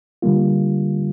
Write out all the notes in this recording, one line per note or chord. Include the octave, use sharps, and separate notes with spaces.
D3 G3 A#3 F4